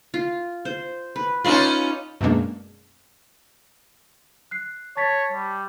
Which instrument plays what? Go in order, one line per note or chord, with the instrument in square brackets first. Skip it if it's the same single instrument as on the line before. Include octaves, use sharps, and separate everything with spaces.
[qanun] F4
C5
B4
[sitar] C#4 D#4 F4 [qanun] B4 D5 E5
[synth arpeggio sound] F#2 B2 G#3 A#3 D4
[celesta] F#6 C7
[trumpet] C#5 [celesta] A5 A6 B6
[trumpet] G3